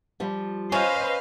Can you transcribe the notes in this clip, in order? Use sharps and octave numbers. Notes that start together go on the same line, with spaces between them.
F3 G3
C#4 B4 C5 D#5 F5